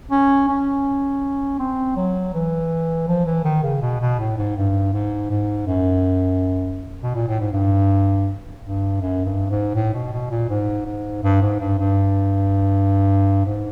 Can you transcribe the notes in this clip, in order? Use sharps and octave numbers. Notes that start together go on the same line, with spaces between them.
C#4
C#4
C4
F#3
E3
F3
E3
D#3
C#3
B2
B2
A2
G#2
G2
G#2
G#2
F#2
B2
A#2
A2
G#2
G2
G2
F#2
G2
G#2
A2
B2
B2
A#2
G#2
G#2
G2
G#2
G2
G2
G#2